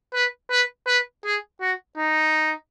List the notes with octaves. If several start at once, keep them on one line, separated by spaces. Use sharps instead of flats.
B4
B4
B4
G#4
F#4
D#4